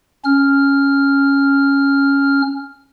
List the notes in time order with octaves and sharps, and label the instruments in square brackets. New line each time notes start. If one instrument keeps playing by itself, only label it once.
[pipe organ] C#4 F6